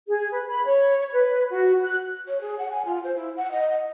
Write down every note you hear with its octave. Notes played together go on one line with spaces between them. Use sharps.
G#4
B4
B5
C#5
B4
F#4
F#6
C#5
G#4
F#5
G#5
F4
C5
E4
F#5
D#5